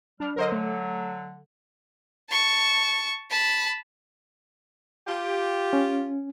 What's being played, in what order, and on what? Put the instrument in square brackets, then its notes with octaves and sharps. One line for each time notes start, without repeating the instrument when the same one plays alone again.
[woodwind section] G3 F6 [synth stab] D4
[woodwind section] D3 F#3 [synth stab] A#4 C5 D#5
[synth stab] A3
[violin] A5 C#6
A5 B5
[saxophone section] F4 G4
[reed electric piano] C#4